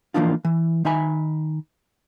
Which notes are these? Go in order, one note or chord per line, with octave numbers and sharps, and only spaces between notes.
E3 F3 A#3 D4 D#4 F4
E3
D#3 D#4 E5 G#5 B5